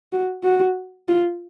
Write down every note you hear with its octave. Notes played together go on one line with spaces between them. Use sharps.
F#4
F#4
F4